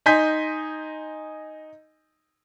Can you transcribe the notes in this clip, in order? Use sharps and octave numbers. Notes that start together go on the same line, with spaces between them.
D#4 D#5 G#5 C6 G6 B6